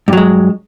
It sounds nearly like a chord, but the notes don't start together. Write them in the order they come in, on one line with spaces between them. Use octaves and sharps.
G2 F#3 G#3